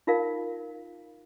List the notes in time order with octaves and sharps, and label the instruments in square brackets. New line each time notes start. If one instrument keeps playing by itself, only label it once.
[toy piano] D#4 F4 A#4 F5